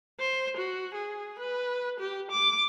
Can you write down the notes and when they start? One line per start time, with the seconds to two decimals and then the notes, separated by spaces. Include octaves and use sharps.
0.20 C5
0.57 F#4
0.95 G#4
1.39 B4
2.00 G4
2.31 D6